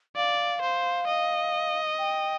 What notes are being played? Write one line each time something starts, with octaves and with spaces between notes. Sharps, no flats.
D5 F5
C5
D#5
G5